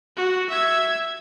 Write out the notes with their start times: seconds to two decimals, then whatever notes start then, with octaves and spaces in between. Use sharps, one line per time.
0.17 F#4
0.50 E5 G#6